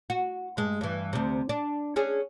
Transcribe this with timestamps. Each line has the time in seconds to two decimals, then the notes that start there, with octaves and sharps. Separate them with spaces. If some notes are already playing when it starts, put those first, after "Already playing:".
0.10 F#4
0.57 G2 G#3
0.81 G2 E3
1.13 D2 C3
1.49 D4
1.96 C#4 D4 G#4